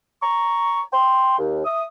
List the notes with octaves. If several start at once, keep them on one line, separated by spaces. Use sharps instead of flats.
A#5 C#6
G5 C6
D#2
E5 D#6